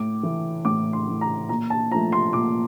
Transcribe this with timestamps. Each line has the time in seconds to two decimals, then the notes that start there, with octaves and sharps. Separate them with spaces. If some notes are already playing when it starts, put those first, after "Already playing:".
Already playing: A2 D6
0.23 E3 A3
0.65 A2 D6
0.93 C6
1.07 E3 A3
1.21 A#5
1.49 A#2 A#5
1.70 A5
1.92 F3 A3 A#5
2.12 C6
2.33 A#2 D6